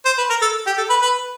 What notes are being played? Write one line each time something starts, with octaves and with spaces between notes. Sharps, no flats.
C5
B4
A#4
A4
G4
A4
B4
B4